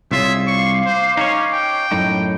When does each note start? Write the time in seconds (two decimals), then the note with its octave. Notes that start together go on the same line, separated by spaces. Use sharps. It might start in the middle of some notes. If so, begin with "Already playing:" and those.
0.12 C2 F4 G#4 C#5 E5
0.47 F5 C#6 D6
0.85 C5
1.17 C#4 D#4 C#5
1.53 G5
1.91 F#2 A2 D#4